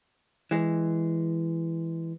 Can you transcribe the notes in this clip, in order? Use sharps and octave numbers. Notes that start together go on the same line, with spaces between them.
E3 G#3